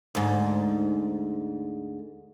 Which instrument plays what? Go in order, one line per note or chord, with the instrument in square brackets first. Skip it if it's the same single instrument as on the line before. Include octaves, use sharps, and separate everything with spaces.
[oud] D2 G#2